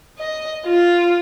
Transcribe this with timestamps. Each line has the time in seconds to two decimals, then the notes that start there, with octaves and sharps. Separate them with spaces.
0.19 D#5
0.66 F4